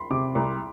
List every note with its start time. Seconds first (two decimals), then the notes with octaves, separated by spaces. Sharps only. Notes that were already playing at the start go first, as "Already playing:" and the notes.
Already playing: B5 C6
0.10 C3 D6
0.35 C2